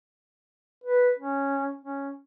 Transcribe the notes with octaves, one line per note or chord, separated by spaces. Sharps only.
B4
C#4
C#4